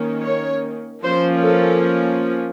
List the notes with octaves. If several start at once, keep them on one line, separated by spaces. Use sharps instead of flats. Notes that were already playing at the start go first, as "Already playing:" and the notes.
Already playing: D#3 A#3 C#4
C#5
F3 A#3 C#4 C5
A4